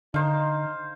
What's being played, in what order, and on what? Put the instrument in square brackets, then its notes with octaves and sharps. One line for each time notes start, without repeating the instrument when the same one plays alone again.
[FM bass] D3 [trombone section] D#4 [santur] C5 F5